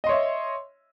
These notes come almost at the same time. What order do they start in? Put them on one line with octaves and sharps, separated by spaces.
D#5 C6 C#5 E5